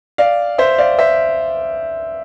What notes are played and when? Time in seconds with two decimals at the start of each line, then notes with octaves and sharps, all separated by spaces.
0.18 D5 F5
0.58 C5 E5
0.78 D5 F5
0.99 C5 E5